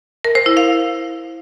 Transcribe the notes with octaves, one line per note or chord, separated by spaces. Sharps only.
A#4
C5
E4
F5